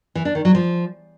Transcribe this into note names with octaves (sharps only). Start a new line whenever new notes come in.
E3
D4
D#3
F#3
F3